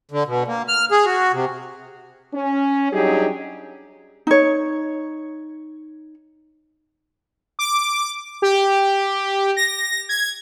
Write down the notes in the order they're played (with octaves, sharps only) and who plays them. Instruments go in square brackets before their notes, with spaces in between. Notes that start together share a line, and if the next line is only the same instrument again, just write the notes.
[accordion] D3
B2
A#3
F6
G#4
F#4
C3
[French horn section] C#4
F#3 G3 D4 D#4 G4 G#4
[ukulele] D#4 C#5
[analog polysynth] D6
G4
A#6
G#6